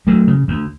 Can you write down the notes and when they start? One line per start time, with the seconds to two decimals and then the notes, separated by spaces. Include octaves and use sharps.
0.07 D2 F#3 A3
0.27 C#3
0.48 D2